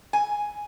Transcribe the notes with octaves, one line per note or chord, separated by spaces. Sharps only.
G#5